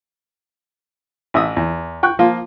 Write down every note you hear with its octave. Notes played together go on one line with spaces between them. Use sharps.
A1 E5 D#6
E2
G5 C#6 F#6
F3 A#3 F4